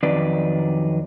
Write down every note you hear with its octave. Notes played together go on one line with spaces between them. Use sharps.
F2 D#3 F#3 B4 D5